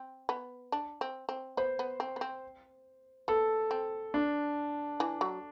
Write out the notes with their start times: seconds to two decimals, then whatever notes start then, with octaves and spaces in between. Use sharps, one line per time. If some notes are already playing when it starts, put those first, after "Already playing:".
Already playing: C4
0.29 B3
0.72 D4
1.01 C4
1.29 C4
1.57 B3 C5
1.79 B3
2.00 C4
2.16 B3
2.21 C4
3.28 B3 A4
3.71 C4
4.14 D4
5.00 E3
5.21 F#3